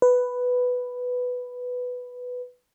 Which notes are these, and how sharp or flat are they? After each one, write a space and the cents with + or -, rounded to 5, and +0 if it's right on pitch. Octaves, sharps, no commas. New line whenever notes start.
B4 +5